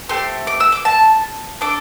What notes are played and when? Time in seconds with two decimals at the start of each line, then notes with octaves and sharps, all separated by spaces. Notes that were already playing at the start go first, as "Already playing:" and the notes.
0.09 A3 C4 G4 C6
0.47 D6
0.60 E6
0.72 D6
0.85 A5
1.61 D4 A4 D6